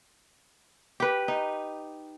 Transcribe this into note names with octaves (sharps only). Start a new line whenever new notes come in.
G4 B4
D#4